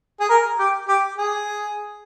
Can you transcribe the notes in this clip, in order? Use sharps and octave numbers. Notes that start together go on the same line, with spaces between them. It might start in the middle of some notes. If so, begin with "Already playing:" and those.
G#4
A#4
G4
G4
G#4